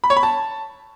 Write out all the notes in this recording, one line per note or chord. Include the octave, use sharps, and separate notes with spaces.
B5
C#5
B5
A5